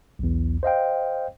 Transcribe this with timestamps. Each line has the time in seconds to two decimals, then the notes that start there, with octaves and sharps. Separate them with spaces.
0.19 B1 E2
0.63 C5 D#5 F5 G5